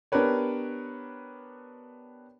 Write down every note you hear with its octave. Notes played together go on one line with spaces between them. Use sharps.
B3 D4 G4 A#4 B4 C#5